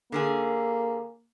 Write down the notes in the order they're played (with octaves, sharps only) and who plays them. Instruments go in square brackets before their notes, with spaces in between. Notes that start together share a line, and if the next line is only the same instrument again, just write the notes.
[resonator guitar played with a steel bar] D3 C#4 G#4 [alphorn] A#3